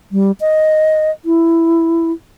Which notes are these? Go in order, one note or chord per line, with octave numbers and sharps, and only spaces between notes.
G3
D#5
E4